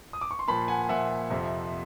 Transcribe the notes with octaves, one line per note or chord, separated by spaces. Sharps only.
D#6
D6
C#6
C6
A#2 F3 A5 B5
F#5 G#5
A#2 F3 E5 F#5
F2 C3 F3